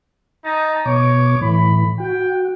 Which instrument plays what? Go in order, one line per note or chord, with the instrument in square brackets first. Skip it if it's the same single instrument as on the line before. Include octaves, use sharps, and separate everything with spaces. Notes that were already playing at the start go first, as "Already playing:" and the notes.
[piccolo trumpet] D#4 [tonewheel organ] A5
[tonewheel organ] B2 D6 [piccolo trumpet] C#5
[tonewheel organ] A2 E3 [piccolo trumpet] B5
[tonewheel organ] F#4 [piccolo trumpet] G5